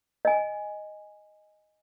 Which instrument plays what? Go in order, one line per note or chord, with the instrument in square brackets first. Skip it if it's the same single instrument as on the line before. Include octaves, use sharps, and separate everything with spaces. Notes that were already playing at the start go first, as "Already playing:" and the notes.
[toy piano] D#5 G#5